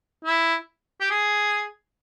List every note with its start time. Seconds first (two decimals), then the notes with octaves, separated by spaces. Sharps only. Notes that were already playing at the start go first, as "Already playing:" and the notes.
0.25 E4
1.00 G4
1.10 G#4